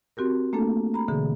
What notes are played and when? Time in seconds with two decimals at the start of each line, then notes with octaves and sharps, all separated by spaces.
0.17 C4 F#4 G4 A#4
0.53 A3 A#3 D4 A4
0.94 A#5 B5
1.08 B2 D3 E3 G#4